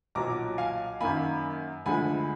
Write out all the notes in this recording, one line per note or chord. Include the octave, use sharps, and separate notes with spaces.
B1 A#2 F#3 A#5 D6
F5 G#5
F#2 D#3 A#3 G#5 B5
D2 D3 F3 G#3 G#5 B5